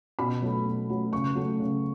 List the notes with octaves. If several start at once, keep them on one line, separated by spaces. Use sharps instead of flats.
B2 B5
F#3 A3
B2
F#3 A3
C#3 C#6
F#3 A3
C#3